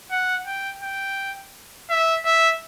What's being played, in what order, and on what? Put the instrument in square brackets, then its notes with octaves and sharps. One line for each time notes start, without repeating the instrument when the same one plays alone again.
[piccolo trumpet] F#5
G5
G5
E5
E5